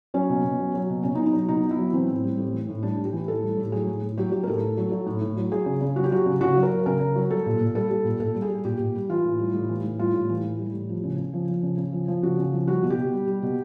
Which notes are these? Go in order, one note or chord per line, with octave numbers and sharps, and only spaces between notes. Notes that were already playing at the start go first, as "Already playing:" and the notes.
F#3 C#4
B2
B2
F#3
F#3
B2
B2 C#4
D#4
F#3
D#4
F#3
B2 D#4
B2
E4
F#3
E3 C4
A2
G3
A2
E3
A2
G3 D4
A2
G4
E3
A2 A4
G3
A2
F#3 G#4
A2
A2
F#3 G4
F#3 G4
A#4
A2 A4
A2
F#3
F#3
A2
A2
F#3
F#3 G#4
C#3
C#3
F#3 F#4
G4
F#3 F#4
C#3
C#3 F#4
F#3
A#4
F#3
C#3 A#4
C#3
F#3
G3 A4
A#2
A#2
G3 A4
G3
A#2
A#2 A4
G3
G#4
G3
A#2 G4
A#2
G3
E3 F4
A2
G3
A2
E3
A2
G3 F4
A2
E3
A2
G3
A2
F3
C#3
C#3
F3
F3
C#3
C#3
F3
F3
C#3 F#4
C#3
F3
G3 F#4
B2
G4
B2
G3
G3
B2